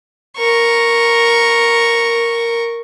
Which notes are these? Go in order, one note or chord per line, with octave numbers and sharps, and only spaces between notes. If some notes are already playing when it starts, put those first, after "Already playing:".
A#4 C#6